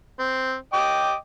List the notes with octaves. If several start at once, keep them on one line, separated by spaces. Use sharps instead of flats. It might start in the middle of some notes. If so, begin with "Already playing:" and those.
C4
D#5 G5 D6